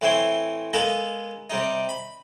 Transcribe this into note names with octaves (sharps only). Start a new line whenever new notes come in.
A2 E3 C4 E4 C6
G#3 A#3 B3 A4 B4 A#5
C3 G3 D#4
B5